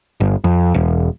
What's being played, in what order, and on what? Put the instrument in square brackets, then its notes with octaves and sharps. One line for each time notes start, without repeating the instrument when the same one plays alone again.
[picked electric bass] G1
F2
E1